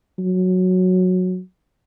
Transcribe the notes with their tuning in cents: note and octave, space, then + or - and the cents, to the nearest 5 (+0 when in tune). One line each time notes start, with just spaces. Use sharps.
F#3 -10